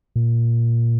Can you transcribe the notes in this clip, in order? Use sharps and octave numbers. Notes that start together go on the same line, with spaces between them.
A#2